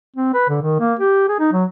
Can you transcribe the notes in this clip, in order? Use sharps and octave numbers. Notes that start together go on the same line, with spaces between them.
C4
B4
D3
D#3
A#3
G4
G#4
D#4
F#3